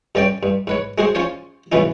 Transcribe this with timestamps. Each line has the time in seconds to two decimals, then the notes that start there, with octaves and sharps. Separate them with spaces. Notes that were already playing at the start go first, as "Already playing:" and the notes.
0.15 G2 D3 C#4 D5 G5
0.43 G2
0.67 G#2 B4 C#5
0.98 G#3 F#4 G#4 C5
1.15 C#4 F4 C5 C#5
1.72 G#2 B2 E3 F3 C#4 D#4